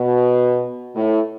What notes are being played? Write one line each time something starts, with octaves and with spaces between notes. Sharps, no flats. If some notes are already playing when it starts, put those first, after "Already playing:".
Already playing: B2
A2